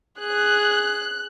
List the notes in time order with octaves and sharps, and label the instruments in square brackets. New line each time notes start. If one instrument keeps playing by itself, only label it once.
[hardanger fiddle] G#4 [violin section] F#6